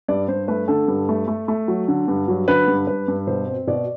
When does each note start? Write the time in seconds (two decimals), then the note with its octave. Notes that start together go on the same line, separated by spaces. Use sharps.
0.08 G2 D5
0.28 G2 C5
0.48 A3 B4
0.68 D3 A4
0.88 G2
1.09 A3
1.28 A3
1.48 A3
1.68 F#3
1.88 D3
2.08 G2
2.28 F#3
2.48 D3 B4
2.68 G2
2.87 G2 B4
3.08 G2
3.27 B2 C5
3.47 C4
3.67 B2 D5